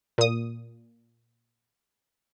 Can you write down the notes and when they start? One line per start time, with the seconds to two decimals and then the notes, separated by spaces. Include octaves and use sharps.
0.18 A#2 D#6